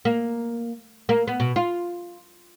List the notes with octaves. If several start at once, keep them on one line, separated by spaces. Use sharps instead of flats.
A#3
A#3
B3
B2
F4